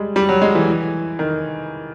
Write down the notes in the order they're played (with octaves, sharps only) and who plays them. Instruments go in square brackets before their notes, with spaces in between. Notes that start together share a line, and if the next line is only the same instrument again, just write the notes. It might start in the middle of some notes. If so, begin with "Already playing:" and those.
Already playing: [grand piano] G3 G#3
G3
F#3
G#3
E3
D#3